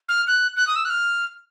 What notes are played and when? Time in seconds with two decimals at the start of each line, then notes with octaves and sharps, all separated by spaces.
0.09 F6
0.27 F#6
0.57 F#6
0.67 D#6
0.76 E6
0.85 F#6
0.90 F6